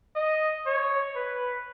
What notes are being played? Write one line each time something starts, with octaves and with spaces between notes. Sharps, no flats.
D#5
C#5
B4